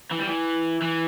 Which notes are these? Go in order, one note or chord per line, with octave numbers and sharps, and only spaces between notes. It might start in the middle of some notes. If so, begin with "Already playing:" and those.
E3
G3
E3
E3